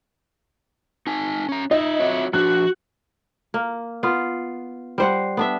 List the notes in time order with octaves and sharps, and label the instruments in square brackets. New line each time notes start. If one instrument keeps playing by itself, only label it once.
[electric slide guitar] D#4 G#5 A5
C#4 A#5
[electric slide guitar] D#4 [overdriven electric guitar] F4 E5 [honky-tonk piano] D#5
[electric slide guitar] C4 F#4 C#5
[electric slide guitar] F3 D4 [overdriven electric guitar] F#4 [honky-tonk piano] F#6
[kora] A#3
B3 F4
G3 C5 F#5
B3 D4 E5